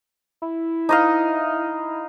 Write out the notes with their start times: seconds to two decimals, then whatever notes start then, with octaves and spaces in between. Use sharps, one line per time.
0.42 E4
0.89 D#4 D#5 F5